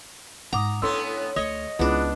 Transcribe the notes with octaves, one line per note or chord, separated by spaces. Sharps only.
G#2 F#5 A#5 D6 D#6
A2 B3 C#4 D4 A4 C6 E6
D2 C#5 D#5
C#2 B3 D4 E4 F4 G#4